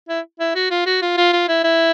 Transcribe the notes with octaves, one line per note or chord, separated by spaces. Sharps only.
E4
E4
F#4
F4
F#4
F4
F4
F4
E4
E4